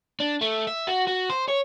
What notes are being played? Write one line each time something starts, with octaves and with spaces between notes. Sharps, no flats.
D4
A3
E5
F#4
F#4
C5
C#5